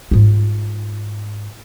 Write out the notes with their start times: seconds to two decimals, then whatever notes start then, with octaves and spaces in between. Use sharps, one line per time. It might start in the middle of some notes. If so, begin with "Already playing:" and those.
0.11 G#2 F4